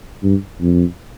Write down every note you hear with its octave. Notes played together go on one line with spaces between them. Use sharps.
G2
F2